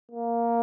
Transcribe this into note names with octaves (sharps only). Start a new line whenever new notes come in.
A#3